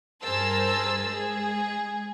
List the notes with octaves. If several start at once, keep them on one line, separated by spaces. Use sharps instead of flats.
G2 G#4 A#4 C5 A5 E6
G#3 G#4